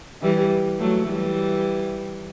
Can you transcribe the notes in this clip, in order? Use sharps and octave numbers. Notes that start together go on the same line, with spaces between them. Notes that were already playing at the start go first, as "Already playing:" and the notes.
E3 G3
F#3 A3
E3 G3